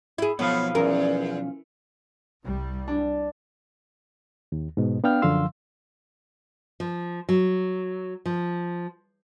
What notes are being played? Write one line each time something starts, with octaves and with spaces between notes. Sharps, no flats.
E4 G#4
B1 F3 A3 B3 C#5 F5
E2 C#4 A#4
C2 G3
D4
D#2
G#2 B2
B3 D4 F5 G5 F6
F#2 D3 F3 F5 C6 E6
F3
F#3
F3